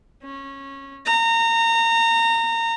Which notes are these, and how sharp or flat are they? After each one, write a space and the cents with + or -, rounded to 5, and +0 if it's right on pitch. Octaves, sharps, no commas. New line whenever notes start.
C#4 -15
A#5 -25